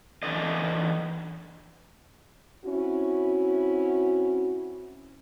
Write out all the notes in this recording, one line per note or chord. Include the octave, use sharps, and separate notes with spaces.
E3 D4 A4 D#5
C4 C#4 E4 F#4